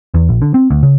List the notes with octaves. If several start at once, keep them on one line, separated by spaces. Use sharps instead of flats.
E2
A#1
D3
C4
D2
C#3